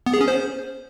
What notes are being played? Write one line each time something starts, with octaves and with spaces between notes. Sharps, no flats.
B3
G#4
C#4
C5